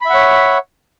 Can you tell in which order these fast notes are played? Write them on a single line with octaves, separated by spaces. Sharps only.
B5 E5 F#5 C#5